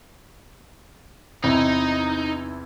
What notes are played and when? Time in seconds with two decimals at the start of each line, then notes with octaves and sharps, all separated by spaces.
1.44 E2 C3 D#4 E4